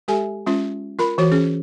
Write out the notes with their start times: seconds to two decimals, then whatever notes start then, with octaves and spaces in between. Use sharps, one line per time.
0.08 G#3 G4 A4 E5 G#5
0.46 G#3 C#4 F4
0.99 F4 A#4 B5
1.18 E3 F#4 C#5
1.32 C#4 G#4